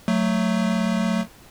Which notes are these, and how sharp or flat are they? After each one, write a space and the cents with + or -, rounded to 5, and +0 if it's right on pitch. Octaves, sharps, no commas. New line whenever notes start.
F#3 +0 A3 +15